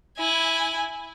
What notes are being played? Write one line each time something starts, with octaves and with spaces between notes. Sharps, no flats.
E4 G#5